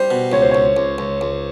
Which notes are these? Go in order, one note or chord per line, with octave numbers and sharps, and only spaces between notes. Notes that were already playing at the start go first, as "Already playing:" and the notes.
Already playing: G3 C5
B2
C#2 C#5
C5
C#2 C#5
C#2
C#2
C#2